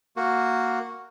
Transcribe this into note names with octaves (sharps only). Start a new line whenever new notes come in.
A#3 F#4